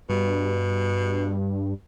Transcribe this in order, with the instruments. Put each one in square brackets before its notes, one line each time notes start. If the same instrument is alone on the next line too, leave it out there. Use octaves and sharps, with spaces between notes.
[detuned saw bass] G2 [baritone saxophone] B2